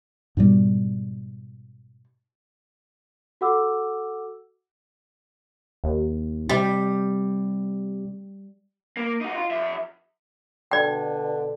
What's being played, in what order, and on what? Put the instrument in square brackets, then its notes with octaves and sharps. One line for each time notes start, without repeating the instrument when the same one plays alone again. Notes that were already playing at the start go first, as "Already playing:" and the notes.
[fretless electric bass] G#2 B2 G3
[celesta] F#4 A4 F#5 D6 E6
[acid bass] D#2
[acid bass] C3 [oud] G3
[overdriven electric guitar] A#3
D#4 F#4
F4
F2 E5
[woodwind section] B2 D3 [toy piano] D5 G5